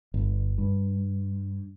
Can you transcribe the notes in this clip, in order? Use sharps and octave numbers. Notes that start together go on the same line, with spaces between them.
G1
G2